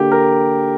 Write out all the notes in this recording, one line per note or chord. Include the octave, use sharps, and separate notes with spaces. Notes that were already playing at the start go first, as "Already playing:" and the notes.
Already playing: D3 A#3 G4
A#4